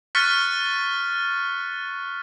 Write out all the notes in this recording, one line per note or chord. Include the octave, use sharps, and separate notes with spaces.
C#6 F6 F#6 A6 B6 C#7